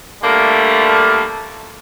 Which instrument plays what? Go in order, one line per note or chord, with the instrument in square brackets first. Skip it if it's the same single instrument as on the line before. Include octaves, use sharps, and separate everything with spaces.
[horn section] D3 G3 A3 A#3